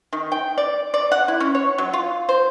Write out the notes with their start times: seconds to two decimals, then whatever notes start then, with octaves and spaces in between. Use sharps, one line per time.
0.13 D#3
0.32 G5
0.58 D5
0.94 D5
1.12 F#5
1.28 E4
1.40 C#4
1.55 C#5
1.78 F#3
1.93 F4
2.29 C5